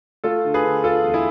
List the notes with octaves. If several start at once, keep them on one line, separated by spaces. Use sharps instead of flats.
A3 F4 A4
D3
G#4 B4
D3
D3 F4 A4
E2
E4 G#4